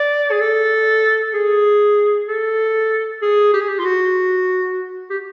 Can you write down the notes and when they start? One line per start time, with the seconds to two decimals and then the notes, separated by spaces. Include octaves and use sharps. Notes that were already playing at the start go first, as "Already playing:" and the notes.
Already playing: D5
0.31 G#4
0.40 A4
1.34 G#4
2.28 A4
3.22 G#4
3.54 G4
3.61 G#4
3.68 G4
3.79 F4
3.85 F#4
5.10 G4